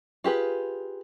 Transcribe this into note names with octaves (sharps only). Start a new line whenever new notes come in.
F4 G4 G#4 B4